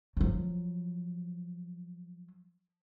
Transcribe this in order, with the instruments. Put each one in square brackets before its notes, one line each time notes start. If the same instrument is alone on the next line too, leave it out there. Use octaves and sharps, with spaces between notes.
[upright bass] F3 F#3